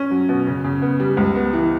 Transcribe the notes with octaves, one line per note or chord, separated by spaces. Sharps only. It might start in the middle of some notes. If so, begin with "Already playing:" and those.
Already playing: C#4
F#3
B2
C#3
C#3
B3
G3
C#2
B3
E3